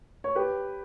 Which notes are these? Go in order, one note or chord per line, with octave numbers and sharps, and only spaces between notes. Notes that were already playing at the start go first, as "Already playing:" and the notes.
C#5
G4 B4